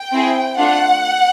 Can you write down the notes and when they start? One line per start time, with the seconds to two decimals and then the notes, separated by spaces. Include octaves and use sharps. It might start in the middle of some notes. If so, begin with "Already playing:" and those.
Already playing: G5
0.13 C4 E4 G#4
0.58 A3 D4 F4 F#5